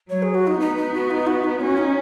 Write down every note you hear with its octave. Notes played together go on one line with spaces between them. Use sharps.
F#3 C#5
G#4
F#4
D#4
B3 D#4
D#4
F#4
D#4
F#4
D#4
C#4 F#4
D#4